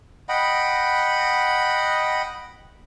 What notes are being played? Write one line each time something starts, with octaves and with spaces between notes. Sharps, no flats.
D#5 F#5 G5 B5